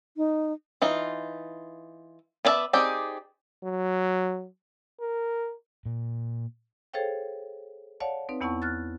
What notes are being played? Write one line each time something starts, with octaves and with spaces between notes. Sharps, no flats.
D#4
E3 D#4 F4
B3 D4 D5 E5 A5
C4 D#4 G4 G#4 D5
F#3
A#4
A#2
G#4 A4 C5 C#5 F5 G5
C#5 D5 F5 F#5 A5
C4 D#4 B4
E2 B3 E4 F#5 A5 C#6
F6 F#6 A6